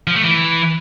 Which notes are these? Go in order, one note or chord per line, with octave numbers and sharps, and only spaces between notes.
F3
A3
E3